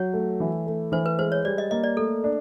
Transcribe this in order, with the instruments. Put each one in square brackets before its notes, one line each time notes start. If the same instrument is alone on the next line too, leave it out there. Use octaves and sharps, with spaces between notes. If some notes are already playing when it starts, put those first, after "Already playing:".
Already playing: [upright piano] F#3 [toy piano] C#5
[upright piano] A3
E3
A3
[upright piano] E3 [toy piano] C5
[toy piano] B4
[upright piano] G#3 [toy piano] C5
[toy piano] C#5
[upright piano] G3 [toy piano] D5
[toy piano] D#5
[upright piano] A#3 [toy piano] D#5
[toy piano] D5
[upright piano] A3 [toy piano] A4
[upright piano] D4